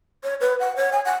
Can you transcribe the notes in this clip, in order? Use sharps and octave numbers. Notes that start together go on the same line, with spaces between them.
C#5
B4
F#5
C#5
G#5
F#5